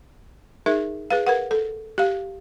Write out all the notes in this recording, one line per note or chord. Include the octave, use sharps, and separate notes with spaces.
D#4 G#4 A#4 E5
G#4 B4 F5
A#4 B4 F#5
A4
G4 F5